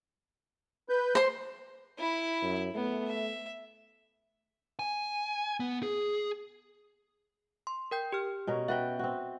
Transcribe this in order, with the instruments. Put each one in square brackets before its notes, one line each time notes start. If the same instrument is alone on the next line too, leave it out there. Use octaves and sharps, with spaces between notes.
[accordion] B4 G6
[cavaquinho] C5 C6
[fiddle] E4 B5
[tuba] F#2
[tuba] A3 [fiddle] B3
[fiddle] E5
[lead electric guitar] G#5
B3
G#4
[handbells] C6
A#4 G5 G6
G4 F6
[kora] B2 C#4 A#4
[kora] F#4 B4 G5 [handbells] E5
[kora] C4 F#4